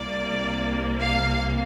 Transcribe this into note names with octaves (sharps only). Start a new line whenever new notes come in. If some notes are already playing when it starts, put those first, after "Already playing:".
Already playing: C2 C3 A#3 D5
F5